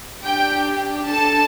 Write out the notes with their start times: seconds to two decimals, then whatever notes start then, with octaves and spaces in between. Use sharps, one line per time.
0.22 D4 G4 G5
1.06 D4 A4 A5